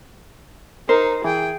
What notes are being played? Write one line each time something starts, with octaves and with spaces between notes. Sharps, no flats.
D#4 A#4 C5
E3 G#4 G5